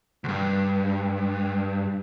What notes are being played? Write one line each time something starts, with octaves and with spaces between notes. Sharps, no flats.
D2 G2